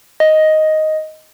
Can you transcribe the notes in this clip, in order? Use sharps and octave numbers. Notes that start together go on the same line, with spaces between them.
D#5